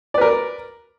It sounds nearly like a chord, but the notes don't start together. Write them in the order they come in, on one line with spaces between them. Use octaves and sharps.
D5 B4 A#4